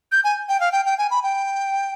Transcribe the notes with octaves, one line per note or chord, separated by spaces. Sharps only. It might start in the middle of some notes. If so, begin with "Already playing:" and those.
G6
G#5
G5
F5
G5
G5
G#5
B5
G5